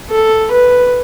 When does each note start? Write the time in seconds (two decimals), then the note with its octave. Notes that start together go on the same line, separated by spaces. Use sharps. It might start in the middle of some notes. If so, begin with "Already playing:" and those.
0.10 A4
0.52 B4